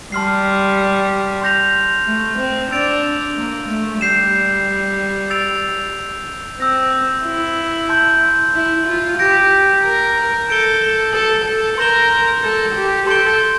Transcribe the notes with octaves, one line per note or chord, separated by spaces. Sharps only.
G3 A5 C6 F6 C7
C6 G6 A#6 F7
A3
C4
D4 E6 A6 D7 F7
A#3
A3
G3 G6 C7 E7
E6 A6 D7 F7
C4 E6 G6 A#6
E4
A5 C6 G6
E4
F4
G4 G6 A#6 D7
A#4
A4 G6 D7 G7
A4
A4
A#4 C6 G6 A#6 E7 G7
A4
G4
A4 C6 G6 D7 G7